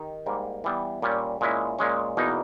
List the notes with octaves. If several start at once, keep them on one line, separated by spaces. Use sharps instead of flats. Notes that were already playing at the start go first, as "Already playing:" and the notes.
Already playing: D#3 D#4 G4
G#2 G3 A#3
E3 G3 B3
A#2 G3 C#4
A#2 G#3 C#4 E4
A#2 G#3 C#4
E2 B2 A#3 D#4